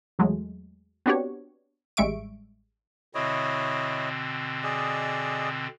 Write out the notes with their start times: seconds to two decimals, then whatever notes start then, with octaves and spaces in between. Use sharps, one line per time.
0.19 E2 F#3 G#3 A3
1.06 B3 C4 D4 F#4 G4 C#5
1.97 A1 G3 G#3 E5 C#6 D7
3.15 B2 D3 C4 E4 C#5 D#5
4.64 G#4 D5 D#5